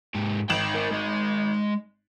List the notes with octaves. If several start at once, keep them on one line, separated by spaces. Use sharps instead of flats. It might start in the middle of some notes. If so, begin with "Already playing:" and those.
G#2 G4
G#1 D#4 G5 E7 F#7
A#4 G#5
G#3 D#5